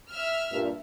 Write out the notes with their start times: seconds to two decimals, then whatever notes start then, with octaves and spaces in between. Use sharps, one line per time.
0.11 E5 F6
0.52 G2 A#2